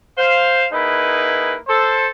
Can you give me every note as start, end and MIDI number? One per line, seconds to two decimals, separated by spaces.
0.18 0.66 72
0.18 0.66 77
0.72 1.56 58
0.72 1.56 63
0.72 1.56 64
0.72 1.56 68
0.72 1.56 71
1.68 2.08 69
1.68 2.08 72